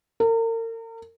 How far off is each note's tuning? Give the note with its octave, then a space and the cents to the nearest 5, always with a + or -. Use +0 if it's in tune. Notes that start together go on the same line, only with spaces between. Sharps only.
A#4 -40